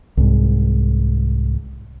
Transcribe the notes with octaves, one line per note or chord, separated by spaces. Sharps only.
C2 G#2